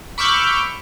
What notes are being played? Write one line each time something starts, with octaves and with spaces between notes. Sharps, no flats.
B5 C#6 D6 E6 F6 G6